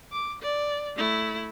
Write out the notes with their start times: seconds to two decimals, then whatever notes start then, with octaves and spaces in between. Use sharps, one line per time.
0.12 D6
0.42 D5
0.97 A3 E4